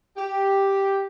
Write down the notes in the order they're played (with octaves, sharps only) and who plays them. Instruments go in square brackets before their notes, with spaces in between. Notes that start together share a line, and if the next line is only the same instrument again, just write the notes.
[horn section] G4